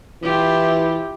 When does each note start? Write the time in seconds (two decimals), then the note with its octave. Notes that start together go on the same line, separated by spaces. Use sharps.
0.23 E3 E4 F4 G4